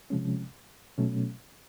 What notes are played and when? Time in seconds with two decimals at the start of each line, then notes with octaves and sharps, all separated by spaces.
0.10 C3 F3 G#3 C#4
0.98 B2 F#3 A3 C#4